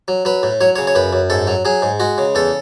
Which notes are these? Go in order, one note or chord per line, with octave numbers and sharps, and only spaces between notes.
F#3
F#3 B4
A2
F#3 C#5
C#3 C#5
C#5
F#2 B4
F#2
G#2 A4
F#3
F#3 G#4
G#2
G#3 F#4
C#3
E2 A4